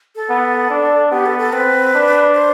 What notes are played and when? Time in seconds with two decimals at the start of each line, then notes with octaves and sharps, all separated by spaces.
0.16 A4
0.29 B3
0.70 D4
1.11 B3 G4
1.26 A4
1.39 A4
1.53 C4 B4
1.94 D4
2.34 C5